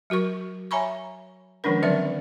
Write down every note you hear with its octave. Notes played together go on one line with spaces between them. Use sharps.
F#3 F#4 A#4 C#6
C#5 E5 G#5 A#5 B5 C#6
D#3 F3 G#3 C#4 D4 A#4
D3 F#3 C4 A#4 D5 E5